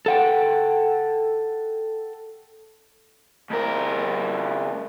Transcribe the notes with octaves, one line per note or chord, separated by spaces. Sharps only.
A4 F#5 G5
C#2 A#4